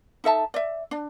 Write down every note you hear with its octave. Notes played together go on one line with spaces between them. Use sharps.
D#4 A4 E5 A5
D5 E5
D4